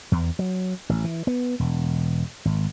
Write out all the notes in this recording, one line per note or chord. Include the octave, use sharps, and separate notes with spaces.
E2
F#3
A1
E3
B3
E1
G#1